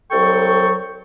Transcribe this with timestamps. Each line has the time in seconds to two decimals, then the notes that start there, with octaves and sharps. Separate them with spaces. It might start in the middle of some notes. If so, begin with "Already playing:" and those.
0.11 C2 F#3 A4 G5 C#6